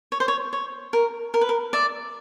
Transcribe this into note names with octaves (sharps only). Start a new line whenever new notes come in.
C#5
C5
C#5
C#5
A#4
A#4
B4
A#4
D5 E5